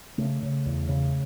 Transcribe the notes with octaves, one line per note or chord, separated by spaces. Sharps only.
C#3 A3
C#3
E2
C#3